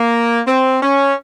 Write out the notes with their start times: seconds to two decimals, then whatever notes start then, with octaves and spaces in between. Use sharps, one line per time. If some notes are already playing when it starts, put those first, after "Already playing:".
Already playing: A#3
0.47 C4
0.83 C#4